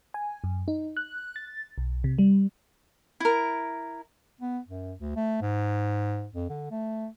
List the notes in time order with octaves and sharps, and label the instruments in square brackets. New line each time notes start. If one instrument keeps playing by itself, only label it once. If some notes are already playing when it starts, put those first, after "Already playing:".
[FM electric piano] G#5
F#2
D#4
F#6
A6
B1
C3
G3
[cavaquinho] E4 A#4
[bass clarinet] B3
F#2
D2
A3
G#2
F2
D3
A3